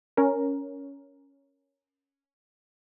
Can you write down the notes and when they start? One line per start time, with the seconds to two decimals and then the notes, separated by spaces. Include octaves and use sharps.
0.17 C#4 A#4